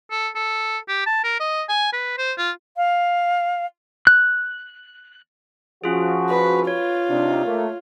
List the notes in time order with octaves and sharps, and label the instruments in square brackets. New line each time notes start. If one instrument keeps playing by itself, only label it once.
[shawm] A4
A4
G4
A5
A#4
D#5
G#5
B4
C5
F4
[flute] F5
[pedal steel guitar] F#6
[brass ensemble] F3 F#4 [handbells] C#4 F4 G#4
[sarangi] B4
[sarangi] F4 [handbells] C#5
[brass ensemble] C3 D4 D#4
A3 A#3